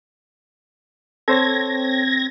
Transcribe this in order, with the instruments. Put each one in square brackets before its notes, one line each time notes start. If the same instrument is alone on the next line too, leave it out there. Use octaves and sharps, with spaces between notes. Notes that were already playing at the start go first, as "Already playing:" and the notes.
[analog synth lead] C4 [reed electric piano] A4 C5 C#5 [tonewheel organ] G#6 A#6